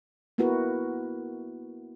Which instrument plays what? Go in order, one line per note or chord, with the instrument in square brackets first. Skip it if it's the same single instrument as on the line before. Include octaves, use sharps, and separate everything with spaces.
[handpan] A#3 B3 E4 F#4 A#4 B4